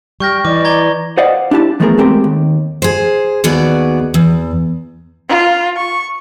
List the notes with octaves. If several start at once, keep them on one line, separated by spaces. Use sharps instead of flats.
G3 G5 C#6 F6 G6 A#6
E3 D5 D#5 D6
A#5 G#6 G7
C5 D5 D#5 F5 F#5
D4 E4 G4 A5
E3 F3 A3 B3 G#4 A#4
G#3 A3 C4 G4 A#4
D#2
G#4 C5
D#2 B3 F#4 G#4 D5
E2
F4
C#6